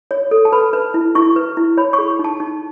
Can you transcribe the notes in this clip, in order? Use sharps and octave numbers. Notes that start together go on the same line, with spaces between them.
C#5
A4
A5
B4 B5
B4
E4
E4 C#6
B4
E4
C#5 B5
C#6
G#4
D#4
A5
D#4